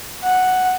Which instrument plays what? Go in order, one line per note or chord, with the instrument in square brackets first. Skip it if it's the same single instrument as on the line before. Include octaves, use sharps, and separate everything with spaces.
[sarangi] F#5